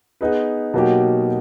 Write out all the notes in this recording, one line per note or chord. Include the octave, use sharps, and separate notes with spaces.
B3 D#4 G#4 B4
B2 F#3 A#3 D#4 G4